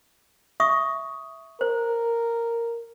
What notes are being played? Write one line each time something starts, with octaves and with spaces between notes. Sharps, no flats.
E5 C#6 D#6
A#4 C5